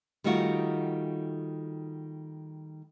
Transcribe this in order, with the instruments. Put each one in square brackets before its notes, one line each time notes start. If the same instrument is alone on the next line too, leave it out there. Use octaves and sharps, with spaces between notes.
[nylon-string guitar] D#3 G3 A3 D#4 F4 F#4